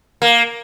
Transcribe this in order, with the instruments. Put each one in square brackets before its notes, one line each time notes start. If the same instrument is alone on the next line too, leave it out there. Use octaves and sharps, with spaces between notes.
[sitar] A#3